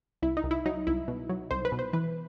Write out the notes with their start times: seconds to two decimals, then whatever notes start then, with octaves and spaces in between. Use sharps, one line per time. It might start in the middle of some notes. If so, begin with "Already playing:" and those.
0.22 C2 E4
0.37 D#4
0.44 C2
0.51 E4
0.66 F#3 D#4
0.87 C2 E4
1.08 B2
1.29 F#3
1.51 C2 C5
1.65 B4
1.72 B2
1.79 C5
1.93 E3 B4